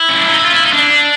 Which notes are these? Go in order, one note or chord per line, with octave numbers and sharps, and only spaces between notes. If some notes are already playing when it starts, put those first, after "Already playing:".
Already playing: E4
C#4
D4
D#4
E4
F4
E4
D#4
D4